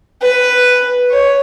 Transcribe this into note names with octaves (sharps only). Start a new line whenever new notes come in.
B4
C#5